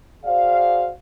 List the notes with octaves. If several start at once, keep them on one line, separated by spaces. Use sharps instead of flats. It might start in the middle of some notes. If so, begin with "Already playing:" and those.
F#4 G#4 C5 D5 F5